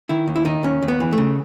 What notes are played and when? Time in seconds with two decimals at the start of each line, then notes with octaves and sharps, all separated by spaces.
0.09 D#3 E4
0.28 D#2
0.36 E4
0.45 D#3 D#4
0.63 D#2 C#4
0.82 D#2
0.88 B3
1.00 E3
1.13 C#3 A3